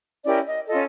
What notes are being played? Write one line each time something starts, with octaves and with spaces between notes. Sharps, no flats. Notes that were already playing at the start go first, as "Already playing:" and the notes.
C#4 E4 G4 A#4 D5
D#5
C#4 F4 A4 D#5